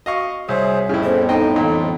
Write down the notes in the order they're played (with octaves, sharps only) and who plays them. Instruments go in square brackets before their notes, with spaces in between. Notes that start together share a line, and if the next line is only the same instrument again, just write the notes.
[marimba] F#4 [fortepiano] D#5 F5 C#6
[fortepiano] C2 [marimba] G3 [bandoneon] G#4 C5 [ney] C#5
[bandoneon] F2 A2 [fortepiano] C#3 E4
[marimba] B3 C#4 [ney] C5
[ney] D#4 [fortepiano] C5 D#5 G5 [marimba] A#5
[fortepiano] A#2 [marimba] D3 E3 A#5